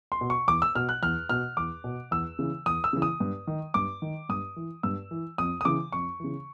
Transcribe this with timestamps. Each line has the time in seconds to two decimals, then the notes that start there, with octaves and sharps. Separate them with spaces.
0.12 C6
0.21 B2
0.30 C#6
0.48 E2 D6
0.62 E6
0.75 B2 F6
0.89 F#6
1.03 E2 F6
1.29 B2 F6
1.57 E2 D6
1.84 B2
2.11 E2 E6
2.39 C#3 E3
2.66 E2 D#6
2.84 E6
2.93 C#3 E3
3.02 D#6
3.20 G2
3.47 D#3
3.74 G2 D6
4.02 D#3
4.29 G2 D#6
4.56 E3
4.83 G2 E6
5.11 E3
5.38 F2 D#6
5.61 D#6
5.65 C#3 E3 D6
5.92 F2 C#6
6.20 C#3 E3